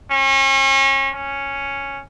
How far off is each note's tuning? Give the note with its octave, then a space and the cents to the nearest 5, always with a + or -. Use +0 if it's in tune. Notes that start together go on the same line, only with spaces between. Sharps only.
C#4 -35
C#4 +0